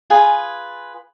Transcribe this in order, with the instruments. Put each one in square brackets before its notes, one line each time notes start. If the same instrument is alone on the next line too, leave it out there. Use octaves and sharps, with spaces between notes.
[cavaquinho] F4 G#4 B4 G#5